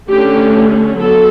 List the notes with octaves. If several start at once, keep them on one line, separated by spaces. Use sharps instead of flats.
D3 A3 C#4 G4
F#3 B3 A4